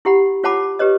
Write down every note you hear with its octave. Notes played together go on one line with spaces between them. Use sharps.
E4 G4 F#5 B5
F4 C#5 F#5 A5 B5 D6
G4 B4 C#5 D#5